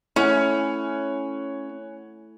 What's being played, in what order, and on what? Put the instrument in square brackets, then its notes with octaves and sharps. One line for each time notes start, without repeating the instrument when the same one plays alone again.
[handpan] A3 E4 A4 [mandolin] C#4 [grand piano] C#5 F#5 G#5